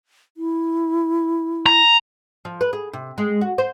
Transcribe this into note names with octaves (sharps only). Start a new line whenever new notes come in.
E4
A#5
F3
B4
G#4
C3
G#3
F#4
C5